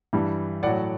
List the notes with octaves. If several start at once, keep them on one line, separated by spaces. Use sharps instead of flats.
G2 E3 G3
A2 F#3 D5 F#5